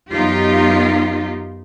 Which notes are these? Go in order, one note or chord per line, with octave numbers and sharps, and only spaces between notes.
F#2 B3 D#4 F4 G4